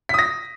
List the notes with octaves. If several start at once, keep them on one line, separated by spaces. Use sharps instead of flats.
D#6 A#6 B6